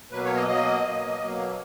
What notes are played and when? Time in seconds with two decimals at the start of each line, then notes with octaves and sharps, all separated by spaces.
0.11 B2 F#3 A#3 B4
0.23 C#5
0.36 D#5
0.47 B2 F#3 A#3 D#5
0.83 B2 F#3 A#3
1.19 B2 F#3 A#3